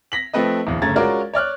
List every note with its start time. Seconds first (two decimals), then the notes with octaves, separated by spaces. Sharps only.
0.12 A#6 B6 F#7
0.34 F3 A3 C4 B4 D#5
0.67 D1 E2
0.82 G1 C#3 A3 A#5 G#6 A6
0.96 G#3 C#4 F4 F#4 A#4 D5
1.34 C#5 D5 F6 F#6